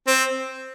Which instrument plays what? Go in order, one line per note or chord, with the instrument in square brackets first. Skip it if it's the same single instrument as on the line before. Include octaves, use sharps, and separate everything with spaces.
[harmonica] C4